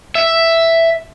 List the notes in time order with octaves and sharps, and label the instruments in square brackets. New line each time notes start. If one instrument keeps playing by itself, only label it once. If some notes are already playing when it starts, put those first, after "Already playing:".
[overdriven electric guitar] E5